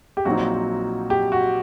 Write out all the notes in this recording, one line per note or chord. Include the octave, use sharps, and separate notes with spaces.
G4
A#1 A#2 F#3 C4 D#4 F#4
G4
F#4